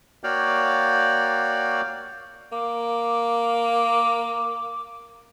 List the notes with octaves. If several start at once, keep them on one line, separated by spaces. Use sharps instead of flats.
A#3 F#4 C#5 D5 F5 G5
A#3 D6